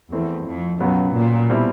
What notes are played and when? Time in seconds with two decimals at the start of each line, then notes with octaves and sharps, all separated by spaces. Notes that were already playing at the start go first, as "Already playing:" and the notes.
0.12 E2 E3 A3 C4 E4
0.46 F2
0.80 C#2 F#2 B2 F#3 B3
1.16 A#2
1.50 B2 G3 C4 E4